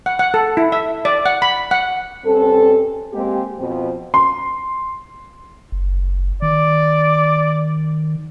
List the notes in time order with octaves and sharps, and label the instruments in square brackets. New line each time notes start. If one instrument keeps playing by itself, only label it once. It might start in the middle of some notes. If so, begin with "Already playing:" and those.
[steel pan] F#5
F#5
A4
E4
E5
D5
F#5
B5
F#5
[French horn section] G2 C4 C#4 A4
G#3 A#3 C4 G4 G#4
F2 B2 F3 C4
[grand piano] C6
[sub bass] F#1
[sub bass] D#3 [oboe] D5